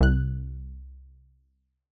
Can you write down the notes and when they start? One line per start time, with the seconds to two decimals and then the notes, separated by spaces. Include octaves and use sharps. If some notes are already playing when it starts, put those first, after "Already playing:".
0.01 C2 F#6